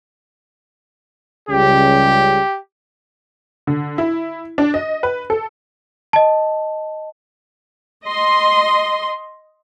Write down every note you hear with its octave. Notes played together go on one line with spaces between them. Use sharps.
C#2 C#3 G3 G4
D3
E4
D4
D#5
B4
A4
D#5 A5
D#5 C6